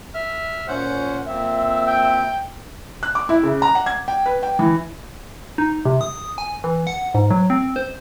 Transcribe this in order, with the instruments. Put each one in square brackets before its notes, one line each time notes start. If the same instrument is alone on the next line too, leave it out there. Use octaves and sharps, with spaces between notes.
[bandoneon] E5 F6
[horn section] A#2 C#4 [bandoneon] C5 F#5
[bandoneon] F2 C4 [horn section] A#3 E5
[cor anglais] G5
[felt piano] F#6
D6
E4
C#3
A#5
F#5
G#6
G5
B4
G5
E3
[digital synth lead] D#4
C3
D#6
G#5
E3
F#5
G#2
F#3
C4
C5